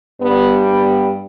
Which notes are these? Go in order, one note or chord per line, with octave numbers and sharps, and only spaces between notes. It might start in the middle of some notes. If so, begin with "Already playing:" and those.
G2 G3 B3
B3